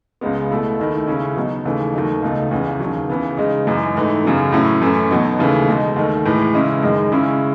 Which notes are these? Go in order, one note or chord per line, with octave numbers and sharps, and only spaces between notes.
C#2 C#3 G#3 B3
B2 A3 E4
D#2 D#3 A3 E4
C#3 G#3 C#4 E4
B2 F#3 B3 D#4
D#2 C#3 E3 A3
D#2 D#3 F#3 A3 D#4
C#2 B2 A3 D#4
E2 C#3 E3
D#2 C#3 F#3
C#3 E3 B3
C#3 G#3 D#4
F#2 E3 G#3 D#4
G#2 E3 A3 D#4
F#2 C#3 F#3 B3
A2 F#3 C#4 E4
F#2 E3 A3 C#4
B2 F#3 B3 D#4
D#2 C#3 E3 A3
B2 G#3 D#4
D#2 D#3 A3
A2 E3 G#3
C#3 G#3 C#4 E4
F#2 D#3 G#3
C#3 G#3 C#4 E4